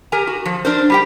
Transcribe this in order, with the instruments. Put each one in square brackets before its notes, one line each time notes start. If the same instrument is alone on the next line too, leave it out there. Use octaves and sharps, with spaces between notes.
[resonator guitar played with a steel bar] G4 A#4 G#5 A#5
F#4
F3
D4 A#4 C5
G3 G4 G5